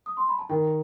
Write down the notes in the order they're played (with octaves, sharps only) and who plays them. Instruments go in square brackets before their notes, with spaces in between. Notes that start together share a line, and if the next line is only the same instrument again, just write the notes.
[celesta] D#6
C6
B5
A5
[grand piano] D#3 [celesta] G5